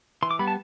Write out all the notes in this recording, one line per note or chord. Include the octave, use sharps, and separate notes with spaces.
E3 C6
D6
G3 B3 B5
A5